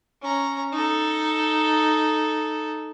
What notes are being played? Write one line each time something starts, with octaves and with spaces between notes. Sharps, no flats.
C#4 A#5
D#4 A4